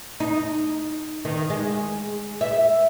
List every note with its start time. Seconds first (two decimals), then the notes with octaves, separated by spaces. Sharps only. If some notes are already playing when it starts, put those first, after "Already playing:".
0.20 D#4
1.25 D#3
1.50 G#3
2.41 E5